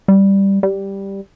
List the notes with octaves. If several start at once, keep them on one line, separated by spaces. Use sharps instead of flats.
G3
G3